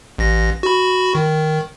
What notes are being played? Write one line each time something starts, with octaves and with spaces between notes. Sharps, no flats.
A1 A#6
F#4 B5
D#3